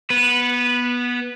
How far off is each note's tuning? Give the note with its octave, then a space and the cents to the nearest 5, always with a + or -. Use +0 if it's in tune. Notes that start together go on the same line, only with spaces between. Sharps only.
B3 -15 B4 +0